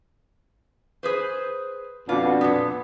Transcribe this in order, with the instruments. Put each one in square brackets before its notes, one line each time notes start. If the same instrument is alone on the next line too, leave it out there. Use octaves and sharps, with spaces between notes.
[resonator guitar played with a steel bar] G#4 B4 C5
[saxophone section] F2 B2 D4 [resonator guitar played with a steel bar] F4
[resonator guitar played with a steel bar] A#2 B3